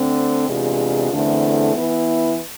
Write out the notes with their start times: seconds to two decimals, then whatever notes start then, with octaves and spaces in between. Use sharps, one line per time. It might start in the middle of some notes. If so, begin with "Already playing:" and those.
Already playing: D3 A3 C4
0.48 E2 C3 G#3 D4 F4
1.12 E2 D3 A3 C4 E4
1.75 E3 B3 E4 B4